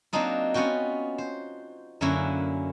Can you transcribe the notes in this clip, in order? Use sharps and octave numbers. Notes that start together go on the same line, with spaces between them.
F#3 A#3 C4 D4 D#4 F4
B3 C#4 F4 F#4 G5
C5
F#2 D3 A#3 C#4 E4 F#4